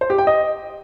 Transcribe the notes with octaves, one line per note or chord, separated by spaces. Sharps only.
C5
G4
G5
D#5